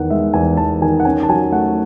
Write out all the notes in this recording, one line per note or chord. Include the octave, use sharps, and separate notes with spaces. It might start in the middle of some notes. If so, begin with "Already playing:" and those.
Already playing: E2 D#3 F#5
G#3 E5
E2 G#5
E2 A5
D#3 G#5
F#5
C#4 G#5
A5
F#3 G#5
A3 F#5